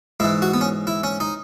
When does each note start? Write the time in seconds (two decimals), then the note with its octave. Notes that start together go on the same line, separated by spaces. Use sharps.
0.20 G#2 E3 E4
0.42 F#4
0.54 B3
0.61 C#4
0.87 E4
1.04 C#4
1.20 D#4